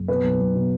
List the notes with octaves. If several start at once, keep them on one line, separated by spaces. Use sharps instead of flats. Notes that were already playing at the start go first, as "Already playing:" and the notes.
Already playing: F#1
B2 B4
B1
B1
B2